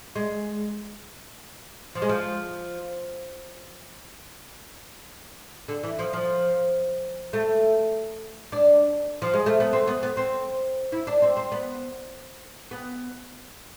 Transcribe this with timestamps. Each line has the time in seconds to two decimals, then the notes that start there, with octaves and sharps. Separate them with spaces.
0.15 G#3
1.95 F3
2.02 G#3
2.09 F3
5.68 D3
5.83 E3
5.99 F3
6.13 F3
7.33 A3
8.52 D4
9.22 F3
9.34 G#3
9.46 A3
9.60 B3
9.73 C4
9.87 B3
10.03 B3
10.17 C4
10.92 E4
11.07 D4
11.22 C4
11.37 C4
11.52 B3
12.71 B3